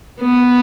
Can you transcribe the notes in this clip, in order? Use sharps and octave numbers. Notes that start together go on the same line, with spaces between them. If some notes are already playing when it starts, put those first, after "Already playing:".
B3